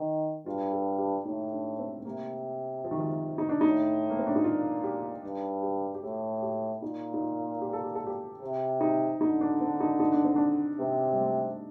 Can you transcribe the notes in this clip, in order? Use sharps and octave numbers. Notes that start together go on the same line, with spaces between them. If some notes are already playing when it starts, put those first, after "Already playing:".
Already playing: D#3
G2 F4
A4
G4
A2 D#4
D4
C4
A3
C3 A#3
F3
D#3
F3
D#4
D4
A2 D#4
A#3
C4
D4
D#4
A#2 F4
G4
G2
G4
G4
A2 A4
G4
A#2 D#4
D#4
F4
G4
A4
G4
A4
G4
C3
D#4
D3 D#4
D4
C4
D#4
D#4
D4
C4
D4
C3 C4
G3
A3